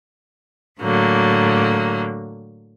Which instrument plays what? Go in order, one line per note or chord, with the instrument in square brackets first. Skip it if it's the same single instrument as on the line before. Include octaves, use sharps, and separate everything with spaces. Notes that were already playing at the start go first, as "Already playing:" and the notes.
[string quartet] A2 D3 F#3 A#3